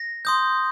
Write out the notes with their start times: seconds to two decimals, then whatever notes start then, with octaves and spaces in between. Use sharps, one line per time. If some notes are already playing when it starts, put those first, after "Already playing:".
Already playing: A#6
0.25 C6 D#6 G6